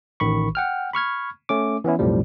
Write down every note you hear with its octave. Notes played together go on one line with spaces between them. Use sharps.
A1 D#3 B5 C#6
F#5 G5 F6
B5 C#6 F6 G#6
A3 C#4 D6
E3 B3 C#4 E4
B1 F2 A2 F3 G3